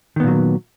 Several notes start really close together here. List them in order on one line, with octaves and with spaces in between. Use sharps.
D#3 B3 A#2 F#3